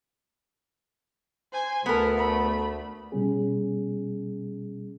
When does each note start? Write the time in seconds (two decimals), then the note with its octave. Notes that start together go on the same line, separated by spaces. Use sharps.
1.52 C5 G#5
1.86 D2 B3 A4 A#4
2.17 A3 B5
3.12 B2 G3 C#4 G#4